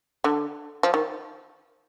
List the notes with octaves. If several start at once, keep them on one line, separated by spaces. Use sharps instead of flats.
D3
F3
D#3